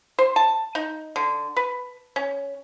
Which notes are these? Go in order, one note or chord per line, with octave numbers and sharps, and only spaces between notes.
C5
A5
D#4
D3
B4
C#4